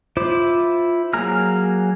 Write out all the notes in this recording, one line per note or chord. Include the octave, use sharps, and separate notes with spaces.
E4 F4 C5 D6
F#3 A#3 G#4 A#5 F6